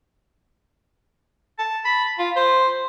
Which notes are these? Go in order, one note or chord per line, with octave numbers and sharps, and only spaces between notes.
A5
B5
F4
C5